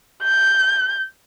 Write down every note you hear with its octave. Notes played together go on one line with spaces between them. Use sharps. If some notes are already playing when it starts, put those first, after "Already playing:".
G6